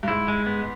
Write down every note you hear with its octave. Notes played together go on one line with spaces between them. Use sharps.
G2
G#2 E4
G#3
B3